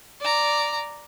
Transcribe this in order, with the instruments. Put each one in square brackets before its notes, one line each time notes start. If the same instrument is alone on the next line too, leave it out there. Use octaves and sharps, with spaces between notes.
[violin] D5 A#5